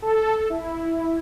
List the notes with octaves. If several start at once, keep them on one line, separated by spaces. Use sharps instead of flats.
A4
E4